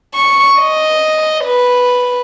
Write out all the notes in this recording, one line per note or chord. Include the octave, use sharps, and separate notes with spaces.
C#6
D#5
B4